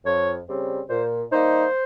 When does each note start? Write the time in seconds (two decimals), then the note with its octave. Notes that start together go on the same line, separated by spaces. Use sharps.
0.05 F2 C#5
0.48 C#3 G3 C4
0.89 A#2 C5
1.31 G3 A#3 D#4 C5